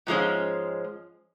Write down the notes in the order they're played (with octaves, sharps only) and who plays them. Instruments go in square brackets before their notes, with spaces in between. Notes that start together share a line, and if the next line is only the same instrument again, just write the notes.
[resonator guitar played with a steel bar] G#2 F3 G#3 C#4